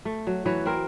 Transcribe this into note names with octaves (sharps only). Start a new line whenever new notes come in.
A3
F#3
E3 F#3 B4 C#5
C4 A#4